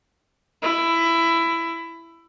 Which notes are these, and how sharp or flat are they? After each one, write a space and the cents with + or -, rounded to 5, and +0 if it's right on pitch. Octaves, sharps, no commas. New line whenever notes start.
E4 +15